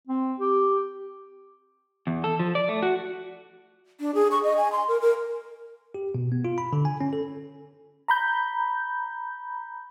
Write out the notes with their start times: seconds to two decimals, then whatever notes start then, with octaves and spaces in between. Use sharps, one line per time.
0.07 C4
0.40 G4
2.07 E2
2.24 A4
2.39 F3
2.55 D5
2.69 A3
2.83 F#4
4.00 D4
4.15 G#4
4.31 C#6
4.43 D#5
4.57 G#5
4.72 C6
4.88 A#4
5.01 A#4
5.94 G4
6.15 B2
6.32 B3
6.45 F4
6.58 B5
6.73 D3
6.85 G#5
7.01 C#4
7.13 A4
8.08 A#5 B5 G6